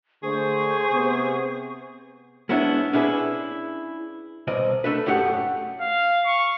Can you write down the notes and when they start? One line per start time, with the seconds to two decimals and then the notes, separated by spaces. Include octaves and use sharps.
0.23 D3 A3 G#4 C5 C#6
0.90 C3 B3
2.49 G#3 B3 C#4 D4 E4
2.93 C#4 D4 E4 G#4 B4
4.47 C2 B2 D5 D#5
4.84 A3 D4 B4
5.06 F#2 A2 A3 G4 F#5
5.81 F5
6.25 C#6